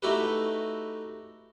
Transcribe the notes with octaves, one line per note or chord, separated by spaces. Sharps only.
A3 D#4 E4 F#4 G4 B4